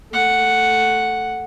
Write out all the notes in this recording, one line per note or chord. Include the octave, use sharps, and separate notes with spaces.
A3 F#5